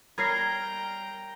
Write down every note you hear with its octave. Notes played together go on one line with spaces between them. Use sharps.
G3 A#4 C#5 G5 A#5 G#6 A#6 C7